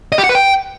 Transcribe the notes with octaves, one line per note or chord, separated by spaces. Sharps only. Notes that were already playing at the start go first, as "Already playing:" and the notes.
D#5
G4
F#5
B4
G5